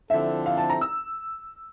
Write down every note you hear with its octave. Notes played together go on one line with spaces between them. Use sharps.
D3 F3 C4 E4 A4 E5
F5
A5
A#5
E6